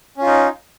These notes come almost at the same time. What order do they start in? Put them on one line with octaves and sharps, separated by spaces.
C#4 F4 D#4